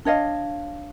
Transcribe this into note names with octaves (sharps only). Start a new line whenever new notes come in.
D4 C#5 D#5 F5